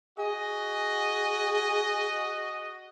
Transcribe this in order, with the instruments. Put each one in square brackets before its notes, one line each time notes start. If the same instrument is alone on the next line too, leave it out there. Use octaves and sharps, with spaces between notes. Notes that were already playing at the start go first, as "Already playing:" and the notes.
[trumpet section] F#4 D#5 [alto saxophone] G#4